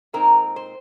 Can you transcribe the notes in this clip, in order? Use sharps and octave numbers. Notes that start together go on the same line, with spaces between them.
A#2 G#3 C4 D#4 A#4
C5